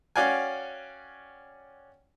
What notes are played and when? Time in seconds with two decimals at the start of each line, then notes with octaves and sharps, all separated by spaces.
0.16 C#4 F#4 D5 F5 G5 G#5